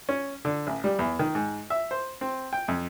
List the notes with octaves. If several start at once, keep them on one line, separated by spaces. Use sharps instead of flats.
C#4
D3
A1
G3
E2
D#3
G#2
E5
C5
C4
G5
F2